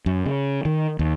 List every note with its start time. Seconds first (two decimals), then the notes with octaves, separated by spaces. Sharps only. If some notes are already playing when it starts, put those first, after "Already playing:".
0.06 F#2
0.26 C#3
0.65 D#3
0.99 D#2